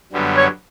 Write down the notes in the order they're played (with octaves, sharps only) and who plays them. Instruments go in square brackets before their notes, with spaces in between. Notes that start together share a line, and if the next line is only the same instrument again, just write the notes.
[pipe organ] F#2 D3 G3 B3
[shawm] C#5